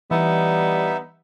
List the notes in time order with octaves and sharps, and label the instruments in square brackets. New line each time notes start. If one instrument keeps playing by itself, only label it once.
[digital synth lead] E3 [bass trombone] G3 [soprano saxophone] B3 [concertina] D#4 E5